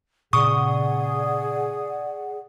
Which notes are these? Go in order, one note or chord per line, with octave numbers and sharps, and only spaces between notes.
A#2 C#3 G#4 D5 F#5 C#6 D#6